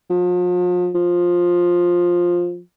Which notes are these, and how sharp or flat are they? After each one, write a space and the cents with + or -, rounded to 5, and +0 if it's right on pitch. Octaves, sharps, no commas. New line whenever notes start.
F3 +40
F3 +10